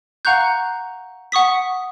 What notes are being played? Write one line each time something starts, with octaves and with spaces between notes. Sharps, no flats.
F5 F#5 A#5 C#6 F#6 G6
F#5 C#6 D#6 B6